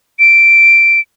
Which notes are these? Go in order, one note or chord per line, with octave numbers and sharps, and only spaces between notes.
D7